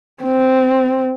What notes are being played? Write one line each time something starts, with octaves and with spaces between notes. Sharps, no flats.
C4